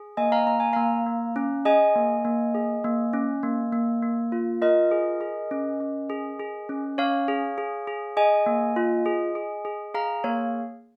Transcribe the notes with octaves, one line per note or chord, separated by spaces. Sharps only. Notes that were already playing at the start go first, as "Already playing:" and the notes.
Already playing: G#4
A#3 D#5 G#5
F5 A#5
A#3 A#5
G#5
A#3 F5 A#5
A#3
C#4
G#4 D#5 G#5
A#3
A#3
G#4
A#3
C#4
A#3
A#3
A#3
F4
F4 A#4 D#5
G#4
G#4
C#4
C#4
G#4
G#4
C#4
C#4 C#5 F5
G#4
G#4
G#4
G#4 D#5 G#5
A#3
F4
G#4
G#4
G#4
G#4 F5 A#5
A#3 C#5 F5